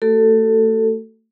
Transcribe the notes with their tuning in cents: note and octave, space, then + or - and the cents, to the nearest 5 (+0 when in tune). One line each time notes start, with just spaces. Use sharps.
A3 +25 F#4 +45 A4 +15